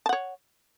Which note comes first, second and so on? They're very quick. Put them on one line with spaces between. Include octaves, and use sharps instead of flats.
A5 F#5 C#5